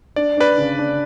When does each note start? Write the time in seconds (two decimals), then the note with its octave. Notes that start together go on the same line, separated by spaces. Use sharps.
0.16 D4 D5
0.37 D4 B4 D5
0.58 C#3
0.78 D4